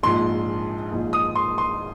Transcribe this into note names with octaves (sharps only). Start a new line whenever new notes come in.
A#1 G#2 F3 C6
A#1 G#2 F3
D#6
C6
C6